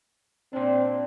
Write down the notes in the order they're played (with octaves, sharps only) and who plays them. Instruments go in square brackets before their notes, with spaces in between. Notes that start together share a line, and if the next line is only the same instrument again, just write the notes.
[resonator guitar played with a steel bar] A#2 D4 [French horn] C4